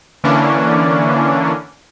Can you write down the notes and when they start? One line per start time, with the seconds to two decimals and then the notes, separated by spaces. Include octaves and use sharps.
0.24 D3 E3 A#3 C#4 D4